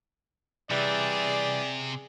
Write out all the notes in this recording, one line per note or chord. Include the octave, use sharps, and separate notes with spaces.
C3 E3 G3 G#4 D5